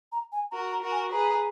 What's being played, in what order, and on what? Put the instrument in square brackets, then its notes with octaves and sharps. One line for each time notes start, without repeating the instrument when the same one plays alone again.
[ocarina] A#5
G#5
[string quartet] F#4 A#4 [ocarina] A#5
[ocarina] A#5
[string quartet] F#4 A#4
[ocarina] G#5
[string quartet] G#4 B4 [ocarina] A#5